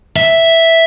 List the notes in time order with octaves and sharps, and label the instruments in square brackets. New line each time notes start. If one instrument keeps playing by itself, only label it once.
[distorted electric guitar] E5